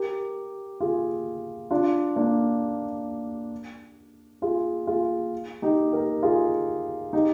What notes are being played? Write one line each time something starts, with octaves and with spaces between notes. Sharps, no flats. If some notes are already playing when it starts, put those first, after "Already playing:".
Already playing: G4 A#4
F4 G#4
D4 F4
A#3 D4
F4 G#4
F4 G#4
D#4 G4
G4 A#4
F4 G#4
D#4 G4